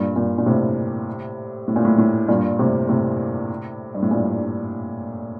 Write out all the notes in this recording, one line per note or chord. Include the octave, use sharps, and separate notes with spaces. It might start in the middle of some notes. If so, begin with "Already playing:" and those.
Already playing: G2 A#2
G2 A#2
A#2
A2 C3
A2
A#2
A2
A2
G2 A#2
A2 C3
A2 C3
G2
A2
G2 A#2